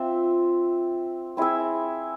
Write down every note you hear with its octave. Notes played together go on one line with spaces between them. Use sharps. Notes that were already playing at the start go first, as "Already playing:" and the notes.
Already playing: C4 F4 C5 E5
C4 E4 G#4 E5